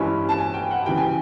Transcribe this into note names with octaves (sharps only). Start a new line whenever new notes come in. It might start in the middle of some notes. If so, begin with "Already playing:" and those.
Already playing: G2 E3 G#3 C#4 E4
A5
G#5
G5
F#5
C#3 E3 G3 G5
G#5